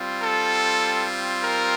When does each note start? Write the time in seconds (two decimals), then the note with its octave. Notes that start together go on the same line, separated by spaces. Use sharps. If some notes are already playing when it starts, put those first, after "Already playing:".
Already playing: G3 C4 F4
0.23 A4
1.42 A#4